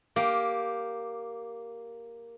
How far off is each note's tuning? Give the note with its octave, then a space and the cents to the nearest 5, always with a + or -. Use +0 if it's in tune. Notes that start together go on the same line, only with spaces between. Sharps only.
A#3 +0 G4 +0